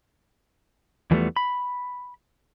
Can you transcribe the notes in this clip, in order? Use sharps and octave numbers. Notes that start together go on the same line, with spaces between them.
E2 E3 F3 G3 A3 B3
B5